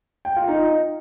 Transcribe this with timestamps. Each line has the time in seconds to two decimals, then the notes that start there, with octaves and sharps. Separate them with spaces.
0.25 G5
0.36 F4
0.48 D#4